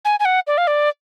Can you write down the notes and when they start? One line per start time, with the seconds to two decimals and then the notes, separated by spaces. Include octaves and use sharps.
0.05 G#5
0.20 G#5
0.25 F#5
0.47 D5
0.58 F5
0.67 D5